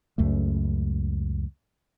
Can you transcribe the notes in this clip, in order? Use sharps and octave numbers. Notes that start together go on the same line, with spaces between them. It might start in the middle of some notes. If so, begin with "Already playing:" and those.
C#2 F#2 A3